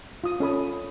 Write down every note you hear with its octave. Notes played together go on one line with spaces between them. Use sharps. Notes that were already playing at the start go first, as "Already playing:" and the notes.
F4 D#6
C#4 A4 B5 D#6